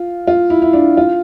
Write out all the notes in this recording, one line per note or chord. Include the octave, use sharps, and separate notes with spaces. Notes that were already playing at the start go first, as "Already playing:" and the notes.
Already playing: F4
F4
E4
E4
D4
F4